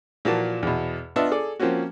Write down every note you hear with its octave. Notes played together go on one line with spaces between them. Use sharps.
A#2 E3 F3 A#3 F#4 A5
E2 B2
B3 D4 F4 D#5 E5 A5
G#4 A4 D5
F3 A#3 C4 C#4 F#4